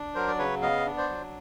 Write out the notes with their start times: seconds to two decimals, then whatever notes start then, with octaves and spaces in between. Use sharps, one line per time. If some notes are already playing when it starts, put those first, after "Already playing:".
Already playing: D4
0.15 F#3 A#4 C5
0.28 D5
0.38 C#3 B4 C#5
0.62 B3 D#5 F5
0.86 D4
0.97 C5 D5
1.09 F#3